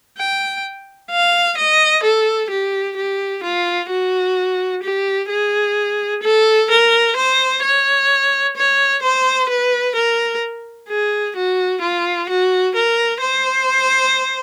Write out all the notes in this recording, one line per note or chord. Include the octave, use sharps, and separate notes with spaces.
G5
F5
D#5
A4
G4
G4
F4
F#4
G4
G#4
A4
A#4
C5
C#5
C#5
C5
B4
A#4
G#4
F#4
F4
F#4
A#4
C5